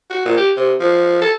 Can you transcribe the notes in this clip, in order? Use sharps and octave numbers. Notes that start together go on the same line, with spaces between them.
F#4
A#2
G4
C3
F3
A4